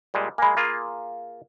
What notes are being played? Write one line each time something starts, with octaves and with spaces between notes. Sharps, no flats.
A#2 G3 G#3
G#3 A#3 G#5 B5
A#3 F4 G#4